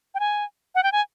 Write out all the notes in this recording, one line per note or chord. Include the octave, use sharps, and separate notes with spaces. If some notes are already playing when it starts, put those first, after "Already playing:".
G5
G#5
F#5
G5
G#5